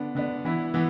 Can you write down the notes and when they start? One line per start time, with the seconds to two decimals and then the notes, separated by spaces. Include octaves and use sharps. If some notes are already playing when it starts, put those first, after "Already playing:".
Already playing: D3 B3 D4
0.15 D3 B3 D4
0.45 E3 B3 E4
0.74 E3 B3